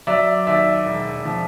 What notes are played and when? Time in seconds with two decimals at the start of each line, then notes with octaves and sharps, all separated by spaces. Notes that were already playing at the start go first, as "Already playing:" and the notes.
0.07 F#3 D5 E5
0.47 D#2 D5 E5
0.86 E1
1.25 F3